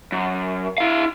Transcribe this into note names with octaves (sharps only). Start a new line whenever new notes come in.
F#2
E4 F5